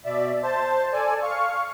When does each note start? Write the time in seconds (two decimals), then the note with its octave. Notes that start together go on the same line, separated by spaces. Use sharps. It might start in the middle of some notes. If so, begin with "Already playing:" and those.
0.05 B2 D5 E5
0.43 C5 A5
0.93 A4 D5 G#5
1.23 F5 C#6